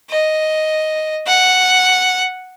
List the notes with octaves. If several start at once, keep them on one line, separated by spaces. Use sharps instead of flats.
D#5
F#5